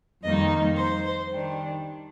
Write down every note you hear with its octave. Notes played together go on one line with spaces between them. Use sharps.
F2 D#3 G3 A#3 D#4 D#5
C5
D#3 G3 D4